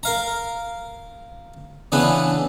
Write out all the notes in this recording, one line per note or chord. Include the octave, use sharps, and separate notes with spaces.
A#4 F5 A#5
C#3 E3 B3 D4